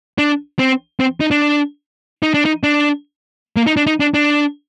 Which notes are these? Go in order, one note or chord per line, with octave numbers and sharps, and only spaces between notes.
D4
C4
C4
D#4
D4
D#4
D4
D#4
D4
A#3
D#4
D4
D#4
D4
D4